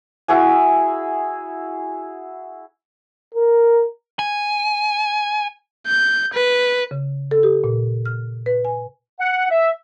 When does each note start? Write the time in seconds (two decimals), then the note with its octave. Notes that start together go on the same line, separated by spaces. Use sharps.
0.28 E4 F#4 G#4 G#5
3.35 A#4
4.19 G#5
5.87 G6
6.33 B4
6.91 C#3
7.31 A4
7.43 G4
7.64 A#2
8.06 F6
8.46 B4
8.65 G#5
9.20 F#5
9.51 E5